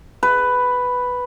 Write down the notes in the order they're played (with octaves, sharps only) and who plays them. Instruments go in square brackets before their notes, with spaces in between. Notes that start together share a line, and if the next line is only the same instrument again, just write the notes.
[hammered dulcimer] B4